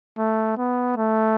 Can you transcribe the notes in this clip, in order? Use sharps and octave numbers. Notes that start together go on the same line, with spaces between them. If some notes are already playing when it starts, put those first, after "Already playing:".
A3
B3
A3